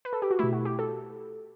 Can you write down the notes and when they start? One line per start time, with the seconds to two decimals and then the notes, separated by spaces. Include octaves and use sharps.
0.05 B4
0.13 A4
0.22 G4
0.31 F#4
0.39 B2 A3 E4
0.53 F#4
0.65 G4
0.79 A4